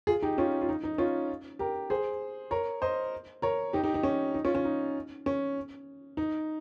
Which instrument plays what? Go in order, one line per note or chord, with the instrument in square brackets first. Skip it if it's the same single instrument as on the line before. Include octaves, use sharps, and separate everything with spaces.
[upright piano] F4 G#4
D#4 G4
C#4 F4
F4
D#4
D#4
C#4 F4
G4 A#4
G#4 C5
A#4 C#5
C5 D#5
A#4 C#5
D#4 G4
D#4 G4
D#4
C#4
D#4
C#4 F4
C#4
D#4
C#4
D#4